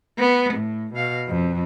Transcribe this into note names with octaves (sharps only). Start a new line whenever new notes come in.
B3
A2
B2 F5
F2